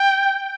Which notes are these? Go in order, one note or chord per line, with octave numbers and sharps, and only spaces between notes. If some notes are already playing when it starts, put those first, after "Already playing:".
Already playing: G5